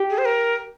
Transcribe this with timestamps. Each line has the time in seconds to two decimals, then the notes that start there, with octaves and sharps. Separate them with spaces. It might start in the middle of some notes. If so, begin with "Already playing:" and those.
Already playing: G4
0.10 G#4
0.18 C5
0.25 A#4